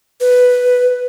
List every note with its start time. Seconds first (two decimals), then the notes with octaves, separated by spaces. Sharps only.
0.21 B4